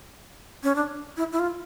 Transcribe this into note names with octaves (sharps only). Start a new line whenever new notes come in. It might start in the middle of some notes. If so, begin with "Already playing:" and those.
C#4
D4
E4
E4
F4